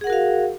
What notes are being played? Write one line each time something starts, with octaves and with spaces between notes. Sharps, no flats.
F#4 G#4 A#4 F5 F#5